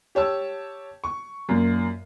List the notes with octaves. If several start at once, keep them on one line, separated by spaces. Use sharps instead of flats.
G4 C#5 A5 E6
C#6
F#2 A#2 A#3